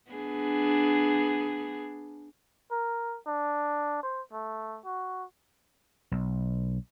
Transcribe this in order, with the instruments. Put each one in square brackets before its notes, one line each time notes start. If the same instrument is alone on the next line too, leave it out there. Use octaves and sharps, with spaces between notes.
[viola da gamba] B3 D4 G#4
[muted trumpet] A#4
D4
C5
A3
F#4
[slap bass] B1